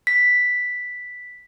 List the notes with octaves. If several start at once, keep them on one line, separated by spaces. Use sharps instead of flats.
B6